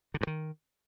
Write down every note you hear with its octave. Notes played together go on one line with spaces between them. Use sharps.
D3
G2
D#3